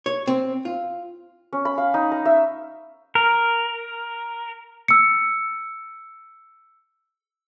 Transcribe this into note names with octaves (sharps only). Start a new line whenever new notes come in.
C#5
C4
F4
C#4
B5
F5
D#4
A#5
E5
A#4
E6 C#7